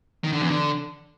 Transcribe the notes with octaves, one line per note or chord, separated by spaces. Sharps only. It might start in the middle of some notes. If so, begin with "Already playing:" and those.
D#3
D3
E2
D3